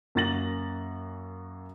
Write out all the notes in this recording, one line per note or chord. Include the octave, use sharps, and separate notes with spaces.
F#2 A#3 F#4 A6 A#6 F#7